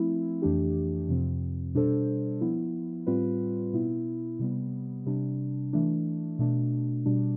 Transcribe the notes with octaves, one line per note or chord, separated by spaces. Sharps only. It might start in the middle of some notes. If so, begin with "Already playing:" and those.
Already playing: F3 A3 C4 E4
F2 E3 A3 D4 G4
F2 C3 F3 C4
B2 G3 D4 A4 C5
F3 B3 E4
A2 G3 C4 F4 B4
B2 B3 E4
C3 G3 B3
C3 G3 D4
E3 A3 D4
B2 A3 D4
B2 G3 D4